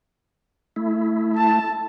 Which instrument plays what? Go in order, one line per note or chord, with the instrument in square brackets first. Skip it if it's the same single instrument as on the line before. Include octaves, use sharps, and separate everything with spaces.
[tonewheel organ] A3 E4
[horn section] A5